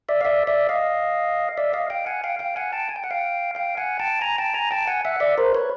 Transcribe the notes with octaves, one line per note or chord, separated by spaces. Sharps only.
D5 E5
F5
D5 E5
D5 E5
D#5 F5
D5 E5
D#5 F5
F5 G5
F#5 G#5
F5 G5
F5 G5
F#5 G#5
G5 A5
G#5
G5
F#5
F5 G5
F5 G5
F#5 G#5
G5 A5
G#5 A#5
G5 A5
G#5 A#5
G5 A5
F#5 G#5
E5 F#5
D5 E5
A#4 C5
B4 C#5